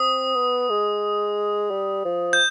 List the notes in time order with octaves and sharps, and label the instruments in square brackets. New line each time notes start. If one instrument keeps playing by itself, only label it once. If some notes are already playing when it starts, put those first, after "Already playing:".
Already playing: [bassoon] C4 [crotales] D#6
[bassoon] B3
G#3
G3
F3
[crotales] G6